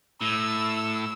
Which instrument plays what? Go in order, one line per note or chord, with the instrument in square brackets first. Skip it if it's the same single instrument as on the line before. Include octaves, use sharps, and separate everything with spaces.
[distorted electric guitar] A2 [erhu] E6